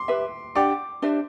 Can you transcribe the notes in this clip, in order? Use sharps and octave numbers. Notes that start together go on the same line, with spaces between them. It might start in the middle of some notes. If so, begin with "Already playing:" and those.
Already playing: C6 D6
G4 B4 E5
D4 G4 D5 F#5 D6
D4 G4 C5 E5